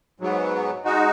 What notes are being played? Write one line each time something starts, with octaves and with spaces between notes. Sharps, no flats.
G#2 F#3 B3
G#3 D#4 F#4